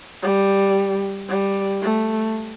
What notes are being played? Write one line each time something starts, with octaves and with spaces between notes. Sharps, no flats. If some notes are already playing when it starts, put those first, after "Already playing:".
G3
G3
A3